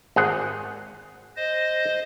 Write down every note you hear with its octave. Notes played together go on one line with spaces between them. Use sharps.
G#1 G#4 F#5
C5 D#5